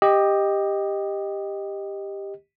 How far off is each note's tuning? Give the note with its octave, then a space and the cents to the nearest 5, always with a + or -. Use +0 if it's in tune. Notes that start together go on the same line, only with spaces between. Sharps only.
G4 +10 D#5 +0